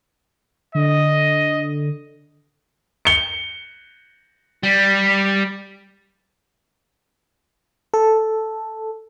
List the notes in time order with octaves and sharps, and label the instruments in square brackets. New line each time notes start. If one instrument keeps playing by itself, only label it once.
[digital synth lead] D3 [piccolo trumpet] D#5
[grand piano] C#7 G7
[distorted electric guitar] G3
[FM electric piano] A4